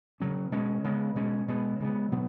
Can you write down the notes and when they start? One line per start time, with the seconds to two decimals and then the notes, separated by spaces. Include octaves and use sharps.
0.20 C#3 F#3 C#4
0.52 B2 G#3 C#4
0.84 C#3 G#3 B3
1.16 B2 G#3 C#4
1.48 B2 G#3 B3
1.80 C#3 G#3 B3
2.12 B2 F#3 B3